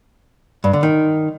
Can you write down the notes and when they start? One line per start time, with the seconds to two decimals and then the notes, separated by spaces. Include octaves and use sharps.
0.64 G2
0.73 D3
0.83 D#3